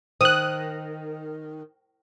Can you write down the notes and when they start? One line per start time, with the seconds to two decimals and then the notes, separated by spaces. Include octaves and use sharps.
0.21 D#3 C5 D#6 F#6